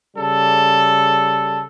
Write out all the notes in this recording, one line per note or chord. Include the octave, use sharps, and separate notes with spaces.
C#3 G3 A4